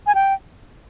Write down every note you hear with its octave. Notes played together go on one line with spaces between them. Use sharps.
G#5
G5